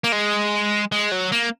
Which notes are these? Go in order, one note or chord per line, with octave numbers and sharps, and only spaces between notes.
A#3
G#3
G#3
F#3
A#3